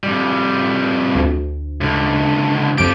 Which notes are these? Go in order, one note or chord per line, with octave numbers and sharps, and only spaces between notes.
F2 G3
D2
C#2 D3
F2 F3 G4 D7